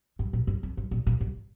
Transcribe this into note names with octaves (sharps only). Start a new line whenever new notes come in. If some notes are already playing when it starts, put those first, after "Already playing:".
G2
A#2
G2
F2
G2
A#2
A#2
G2